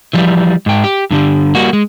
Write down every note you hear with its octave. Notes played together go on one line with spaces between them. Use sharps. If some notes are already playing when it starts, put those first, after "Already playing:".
E3 F3 G3
G#2 G5
G4
G2 D3 G3
G3 A#3 F#4
G#3